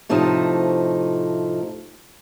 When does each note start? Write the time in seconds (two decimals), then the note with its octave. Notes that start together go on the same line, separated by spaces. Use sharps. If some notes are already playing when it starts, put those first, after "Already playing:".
0.09 A2 C3 F3 A3 D#4